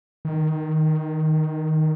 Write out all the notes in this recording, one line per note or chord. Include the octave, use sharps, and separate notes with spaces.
D#3